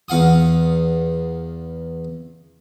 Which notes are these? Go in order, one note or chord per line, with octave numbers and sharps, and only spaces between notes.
E2 F5 F#5 D#6